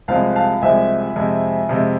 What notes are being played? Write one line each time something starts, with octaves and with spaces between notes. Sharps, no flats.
C2 C3 F3 G#3 F5 A5
F5 A5
C2 C3 F3 G#3 E5 G#5
F2 C3 G#3
F2 C3 G#3